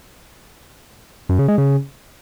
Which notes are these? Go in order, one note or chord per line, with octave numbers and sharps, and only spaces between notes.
F#2
C#3
G#3
C#3